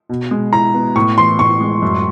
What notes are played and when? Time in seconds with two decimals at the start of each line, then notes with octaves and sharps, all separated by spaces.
0.09 B2
0.31 G#3
0.53 E4 A#5
0.74 B3
0.96 A2 C#6
1.18 E3 C6
1.39 A2 C#6
1.61 G#3
1.82 F#2